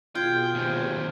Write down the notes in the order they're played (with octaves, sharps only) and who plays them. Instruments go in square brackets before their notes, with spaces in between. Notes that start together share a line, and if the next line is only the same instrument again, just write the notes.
[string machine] B2 G#4 [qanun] F4 [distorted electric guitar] G5 [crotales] F6 G6 G#6
[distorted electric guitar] D#2 C3